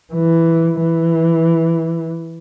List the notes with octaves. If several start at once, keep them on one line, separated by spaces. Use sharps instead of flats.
E3
E3